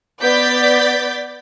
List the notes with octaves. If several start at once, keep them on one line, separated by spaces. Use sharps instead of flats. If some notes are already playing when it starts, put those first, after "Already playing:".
B3 D5 G6 A6 B6